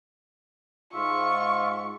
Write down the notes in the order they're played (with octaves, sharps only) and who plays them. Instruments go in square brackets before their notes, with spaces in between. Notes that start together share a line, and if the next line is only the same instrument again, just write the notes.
[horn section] G#2 [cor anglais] F4 [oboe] E5 [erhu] C#6